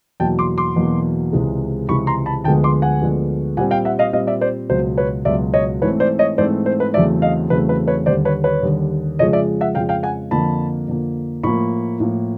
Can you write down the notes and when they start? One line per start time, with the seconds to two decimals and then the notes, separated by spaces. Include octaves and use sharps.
0.20 E2 B2 F#3 A#3 G5 A5
0.39 C6 D6
0.58 C6 D6
0.76 E2 B2 F#3 A#3
1.33 C#2 C3 E3 G#3
1.89 C#2 C3 E3 G#3 B5 C#6
2.07 A#5 C6
2.26 A5 B5
2.44 D2 D3 F3 G#3 B3 G5 A5
2.64 C6 D6
2.82 F#5 G#5
3.01 D2 D3 F3 G#3 B3
3.57 A#2 G3 C4 F#5 G#5
3.71 F5 G5
3.85 E5 F#5
3.99 D#5 F5
4.13 A#2 G3 C4 D#5 F5
4.27 D5 E5
4.41 C5 D5
4.69 C#2 B2 F#3 C5
4.98 B4 C#5
5.25 C#2 B2 F#3 D5 E5
5.54 C#5 D#5
5.82 G#2 E3 A3 C4 B4 C#5
6.00 C5 D5
6.19 C#5 D#5
6.38 G#2 E3 A3 C4 C5 D5
6.66 C5
6.80 B4
6.94 E2 C#3 F#3 A3 C4 D5 E5
7.22 D#5 F5
7.50 E2 C#3 F#3 A3 C4 B4
7.69 B4
7.88 B4 C#5
8.06 D#2 D3 G3 C5 D5
8.25 B4 C#5
8.44 B4 C#5
8.63 D#2 D3 G3
9.19 F2 C#3 F3 G#3 C#5 D#5
9.33 D5 E5
9.61 E5 F#5
9.75 F2 C#3 F3 G#3 F5 G5
9.89 F5 G5
10.03 F#5 G#5
10.31 F2 D3 F3 A#3 A5 B5
10.88 F2 D3 F3 A#3
11.43 A2 F3 A#3 B5 C#6
12.00 A2 F3 A#3